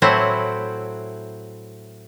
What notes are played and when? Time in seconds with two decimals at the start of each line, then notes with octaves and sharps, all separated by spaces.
0.02 A2 F#3 C4 E4 F#5